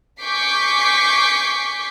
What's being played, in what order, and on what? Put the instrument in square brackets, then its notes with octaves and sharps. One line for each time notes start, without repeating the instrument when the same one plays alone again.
[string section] G#5 C#6 D6 G6 B6 C7